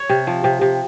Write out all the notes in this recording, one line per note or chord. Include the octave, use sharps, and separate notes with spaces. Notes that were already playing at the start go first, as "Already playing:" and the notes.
Already playing: C#5
C3
F3
C3
C3